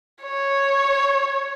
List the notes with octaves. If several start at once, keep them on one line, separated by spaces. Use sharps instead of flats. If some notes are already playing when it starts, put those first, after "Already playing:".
C#5